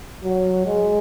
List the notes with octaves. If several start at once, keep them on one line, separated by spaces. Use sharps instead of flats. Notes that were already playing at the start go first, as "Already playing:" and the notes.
F#3
G#3